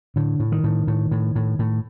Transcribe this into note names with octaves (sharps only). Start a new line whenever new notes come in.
A2 D3
A2
D#3
A2
A2
A2
A2
A2